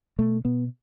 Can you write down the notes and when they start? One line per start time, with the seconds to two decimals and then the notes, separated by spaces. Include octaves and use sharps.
0.18 B2 A3
0.45 B2 B3